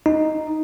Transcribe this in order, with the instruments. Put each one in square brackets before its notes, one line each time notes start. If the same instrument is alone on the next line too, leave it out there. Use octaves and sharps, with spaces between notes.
[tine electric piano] D#4